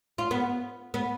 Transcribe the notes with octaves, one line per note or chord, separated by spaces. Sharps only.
F4
B3
B3